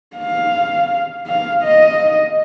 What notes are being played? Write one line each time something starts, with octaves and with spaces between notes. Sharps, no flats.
F5
F5
D#5